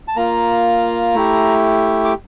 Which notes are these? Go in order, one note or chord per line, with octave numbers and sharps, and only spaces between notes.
A5
A#3 F4 A#5
A3 E4 G4
D6